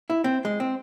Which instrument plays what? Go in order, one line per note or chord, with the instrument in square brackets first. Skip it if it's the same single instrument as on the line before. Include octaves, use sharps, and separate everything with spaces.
[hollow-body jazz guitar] E4
C4
G#3
C4